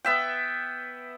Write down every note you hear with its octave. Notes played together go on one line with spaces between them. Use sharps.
B3 E5 G5